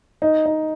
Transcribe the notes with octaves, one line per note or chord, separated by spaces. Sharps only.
D#4
D#4